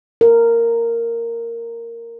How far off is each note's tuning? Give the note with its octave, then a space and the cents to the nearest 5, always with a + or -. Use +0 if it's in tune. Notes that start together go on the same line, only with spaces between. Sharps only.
A#4 -10